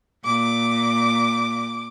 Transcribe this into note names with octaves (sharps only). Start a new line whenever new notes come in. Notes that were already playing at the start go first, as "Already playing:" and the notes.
A#2 D6